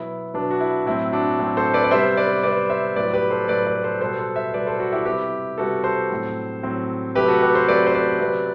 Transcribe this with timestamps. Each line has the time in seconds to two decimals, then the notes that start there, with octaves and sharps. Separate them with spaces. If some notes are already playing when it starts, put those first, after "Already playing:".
Already playing: B2 F#3 B3 E4
0.34 B2 F#3 B3 D4
0.51 F#4
0.60 E4
0.86 A2 F#3 C4 E4
1.12 D4 F#4
1.39 A2 F#3 C4
1.57 A4 C5
1.74 B4 D5
1.84 D5
1.91 C3 G3 B3 C5 E5
2.17 B4 D5
2.43 C3 G3 B3 B4 D5
2.70 C5 E5
2.96 A2 F#3 B3 B4 D5
3.14 G4 B4
3.31 A4 C5
3.48 A2 F#3 B3 B4 D5
3.66 B4 D5
3.83 A4 C5
4.00 B2 G3 B3 A4 C5
4.19 A4 C5
4.36 C5 E5
4.54 B2 G3 B3 B4 D5
4.67 A4 C5
4.80 F#4 A4
4.92 E4 G4
5.01 A4
5.06 C3 G3 B3 E4 G4
5.58 C3 G3 B3 F#4 A4
5.84 A4 C5
6.10 A2 F#3 C4
6.63 A2 F#3 C4
7.15 C3 F#3 A3 G4 B4
7.28 F#4 A4
7.42 G4 B4
7.54 A4 C5
7.68 C3 F#3 A3 B4 D5
7.87 C5
7.94 B4 D5
8.20 C3 F#3 B3